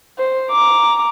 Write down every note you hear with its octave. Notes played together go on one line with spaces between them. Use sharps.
C5
A#5 D6